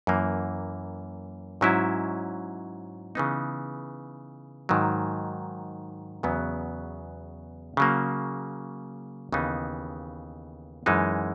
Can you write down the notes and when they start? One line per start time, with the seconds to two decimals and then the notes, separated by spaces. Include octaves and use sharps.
0.07 F#2 E3 A#3
1.61 G#2 F#3 C#4 E4
3.15 C#3 E3 B3 D#4
4.69 G#2 D#3 F#3
6.23 E2 C#3 F#3 B3
7.77 C#3 F#3 A#3
9.32 D#2 C#3 E3 B3 D#4
10.86 F#2 E3 G#3 D#4